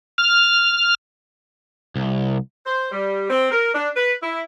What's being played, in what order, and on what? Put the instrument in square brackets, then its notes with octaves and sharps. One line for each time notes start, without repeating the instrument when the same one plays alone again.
[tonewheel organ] F6
[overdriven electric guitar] C2
[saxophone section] C5
G3
C4
A#4
D4
B4
E4